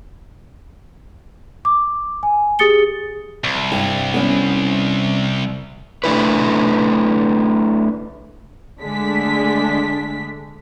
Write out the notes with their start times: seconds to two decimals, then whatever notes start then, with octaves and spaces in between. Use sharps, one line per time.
1.65 D6
2.23 G#5
2.59 G4 G#4 D#6 A6 C#7 G7
3.44 C2
3.72 G2
4.14 B3 C#4
6.04 A3 D4 E4 B4
8.80 D3 G#3 A3 D4 B6